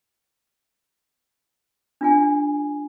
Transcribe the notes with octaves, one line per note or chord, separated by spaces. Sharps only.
D4 F4 G#5